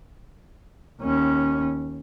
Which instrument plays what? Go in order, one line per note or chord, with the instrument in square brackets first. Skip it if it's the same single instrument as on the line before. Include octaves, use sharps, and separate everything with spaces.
[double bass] D#2 C#4